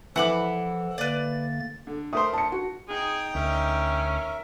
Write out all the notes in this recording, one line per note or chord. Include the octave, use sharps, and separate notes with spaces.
E3 F3 A4 F#5 B5 D6
D3 A#3 B4 D5 A6
D3
A3 A#4 C5 D#6
A5 C#7
F#4
D#4 G#4 G5
D2 C#4 A#4 E5